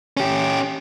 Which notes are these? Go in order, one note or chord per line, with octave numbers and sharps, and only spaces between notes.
C#4 G4